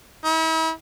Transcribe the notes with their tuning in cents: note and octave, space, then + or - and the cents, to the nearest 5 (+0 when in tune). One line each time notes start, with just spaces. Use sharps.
E4 -40